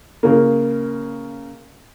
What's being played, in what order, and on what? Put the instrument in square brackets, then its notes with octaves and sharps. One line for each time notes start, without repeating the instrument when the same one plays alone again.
[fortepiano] C#3 A#3